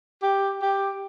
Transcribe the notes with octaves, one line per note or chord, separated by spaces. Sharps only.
G4
G4